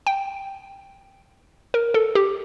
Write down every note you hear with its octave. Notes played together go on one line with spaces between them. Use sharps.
G5
A#4
A4
G4